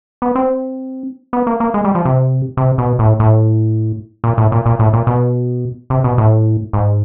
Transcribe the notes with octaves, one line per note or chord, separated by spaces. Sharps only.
B3
C4
B3
A#3
A#3
G#3
G3
F3
C3
C3
B2
A2
A2
A#2
A2
A#2
A#2
A2
A#2
B2
C3
B2
A2
G#2